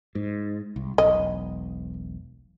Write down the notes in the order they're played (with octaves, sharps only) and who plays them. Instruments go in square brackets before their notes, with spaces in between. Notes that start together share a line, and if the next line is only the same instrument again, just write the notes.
[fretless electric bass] G#2
C2
[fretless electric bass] E1 B1 [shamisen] D#5